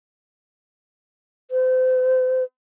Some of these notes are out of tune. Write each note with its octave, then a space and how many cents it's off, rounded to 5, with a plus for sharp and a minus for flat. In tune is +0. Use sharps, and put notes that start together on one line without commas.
C5 -35